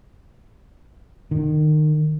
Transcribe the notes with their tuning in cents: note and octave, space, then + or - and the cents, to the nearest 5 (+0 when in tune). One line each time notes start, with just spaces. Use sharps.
D#3 -30